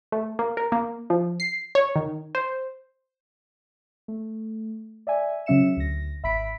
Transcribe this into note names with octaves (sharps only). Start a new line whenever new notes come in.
A3
A#3
A#4
A#3
F3
C7
C#5
D#3
C5
A3
D5 E5 G#5
C#3 F#3 C#4 E5 C#7 E7
D2 A#6
G#1 E5 B5 B6 D7